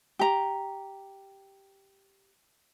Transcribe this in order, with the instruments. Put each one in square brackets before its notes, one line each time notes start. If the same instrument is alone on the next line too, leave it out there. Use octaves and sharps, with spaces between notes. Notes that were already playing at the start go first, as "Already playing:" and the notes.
[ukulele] G4 A#5